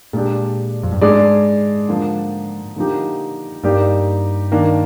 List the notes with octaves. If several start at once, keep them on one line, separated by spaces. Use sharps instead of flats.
A#2 G#3 D4 G4
F2
G2
G#2 G#3 D4 G#4 D5
D3 F3 A#3
D3 F3 A#3 D#4 G4
G2 A#3 D#4 G4 D5
D#3 A#3 D4